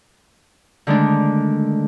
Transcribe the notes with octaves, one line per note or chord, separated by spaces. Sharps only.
D3 D#3 G#3 A3 D4